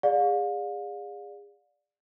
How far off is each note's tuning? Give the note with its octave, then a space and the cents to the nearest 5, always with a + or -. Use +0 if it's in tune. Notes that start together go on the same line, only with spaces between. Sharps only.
G#4 -30 D5 +0 F5 +35